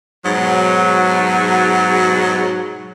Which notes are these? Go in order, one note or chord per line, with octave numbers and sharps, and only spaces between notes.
G#2 B2 F#3